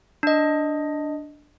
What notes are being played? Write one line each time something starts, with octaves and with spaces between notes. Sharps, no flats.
D4 D#5